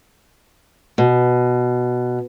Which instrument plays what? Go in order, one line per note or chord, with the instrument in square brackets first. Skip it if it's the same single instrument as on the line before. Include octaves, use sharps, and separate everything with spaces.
[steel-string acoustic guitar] B2